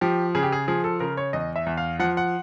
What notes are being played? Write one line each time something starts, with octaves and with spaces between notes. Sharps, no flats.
F3 G4
C#3 G#4
G4
G#4
F3 G#4
A4
C#3 A#4
C#5
E2 D#5
E5
E2
F5
F3 F#5
F#5